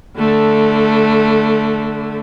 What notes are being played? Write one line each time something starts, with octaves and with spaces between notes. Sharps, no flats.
D3 A3